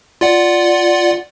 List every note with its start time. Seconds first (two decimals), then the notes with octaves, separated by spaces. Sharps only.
0.21 F4 D5 F#5